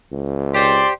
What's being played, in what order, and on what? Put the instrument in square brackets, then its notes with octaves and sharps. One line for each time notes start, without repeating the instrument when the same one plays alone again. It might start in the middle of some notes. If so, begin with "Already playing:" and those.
[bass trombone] C#2
[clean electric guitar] G4 C5 [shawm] D5 [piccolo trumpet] C6